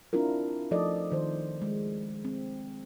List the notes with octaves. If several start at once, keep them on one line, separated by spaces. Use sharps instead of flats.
C4 D4 E4 F4 A#4
F3 A3 D#4 A4 D5 D#5
D#3 C5
G#3
C4